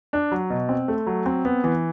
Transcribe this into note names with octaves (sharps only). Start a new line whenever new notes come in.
D4
F#3
B2
C4
A3
F#3
C4
B3
E3